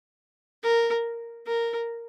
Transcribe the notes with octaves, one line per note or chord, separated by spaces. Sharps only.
A#4
A#4